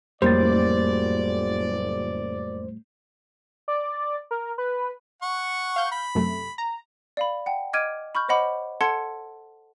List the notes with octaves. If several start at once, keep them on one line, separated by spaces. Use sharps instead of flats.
F#1 F2 A2 G3 A#3 C5 D5 A6
D5
A#4
B4
F#5 C#6
F5 G6
B5
F#2 C3 A3
A#5
D5 F5 B5
F#5 G5 A5
D#5 D6 F6 G#6 D7 D#7
B5 C#6 F6 G6
C5 C#5 D#5 F#5 B5 D6
A4 F#5 A5 C6 G#6 C#7